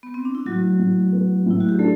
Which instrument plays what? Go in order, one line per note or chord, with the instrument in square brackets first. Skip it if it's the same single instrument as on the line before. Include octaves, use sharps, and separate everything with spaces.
[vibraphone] B3
C4
D4
E4
[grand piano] A2 [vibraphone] F#3 F#4
[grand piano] A2
B3
[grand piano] A2 [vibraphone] E4
[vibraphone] F#4
G4
[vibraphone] A3 A4 [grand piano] D4